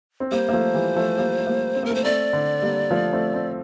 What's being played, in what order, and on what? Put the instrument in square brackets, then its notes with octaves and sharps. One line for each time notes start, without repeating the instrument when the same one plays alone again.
[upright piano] C4
[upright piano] G3 A#3 [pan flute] C5
[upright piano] A#3
F3 A3
E3 G3
F3 A3
G3 A#3
A3
G3 A#3
C4
[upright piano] A#3 [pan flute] A#4
[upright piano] A3 C4 [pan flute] C5
[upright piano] A3 C4 [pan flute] D5
[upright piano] D3
G3 A#3
F3 A3
A3 C4
A3 C4